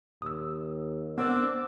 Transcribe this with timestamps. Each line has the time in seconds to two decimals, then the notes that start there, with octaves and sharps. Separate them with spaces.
0.22 D#2 D#6 E6
1.18 B3 C4 D4 A#4 D6 E6